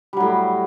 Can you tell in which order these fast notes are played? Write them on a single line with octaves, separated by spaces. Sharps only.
G3 F#3 A2